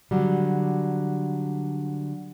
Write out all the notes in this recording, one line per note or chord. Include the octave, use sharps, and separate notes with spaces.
D3 F#3 G3